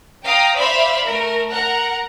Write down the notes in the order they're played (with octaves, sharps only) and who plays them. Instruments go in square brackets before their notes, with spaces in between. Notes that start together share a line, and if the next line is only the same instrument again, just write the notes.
[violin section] F5 G5 A#5 D#6
C5 D5 E5 F5 B5
A3 A#4
A#4 F#5 A#5